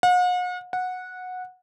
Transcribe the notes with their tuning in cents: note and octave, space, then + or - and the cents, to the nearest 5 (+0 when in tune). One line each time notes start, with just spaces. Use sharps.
F#5 -45
F#5 -15